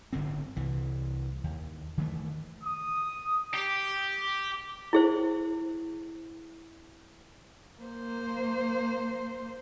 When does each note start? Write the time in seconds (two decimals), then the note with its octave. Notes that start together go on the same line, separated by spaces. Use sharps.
0.13 G1 A2 D3 C4
0.56 C2 E3
1.44 D#2
1.98 D#3 E3 G3 A3
2.64 D#6
3.54 G4
4.93 E4 G#4 C5
7.79 A#3 C5